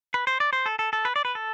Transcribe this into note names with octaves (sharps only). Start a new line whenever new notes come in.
B4
C5
D5
C5
A4
A4
A4
B4
D5
B4
A4